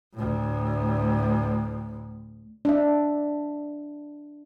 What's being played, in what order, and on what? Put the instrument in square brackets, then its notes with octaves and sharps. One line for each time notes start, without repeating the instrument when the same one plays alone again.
[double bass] D2 A2
[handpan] D4 E5